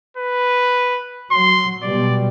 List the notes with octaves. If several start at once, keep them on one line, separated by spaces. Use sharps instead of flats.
B4
F#3 C6
B2 G3 D5